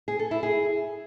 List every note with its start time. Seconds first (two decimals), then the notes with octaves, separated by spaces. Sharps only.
0.08 G#4
0.19 A4
0.31 E4
0.43 G#4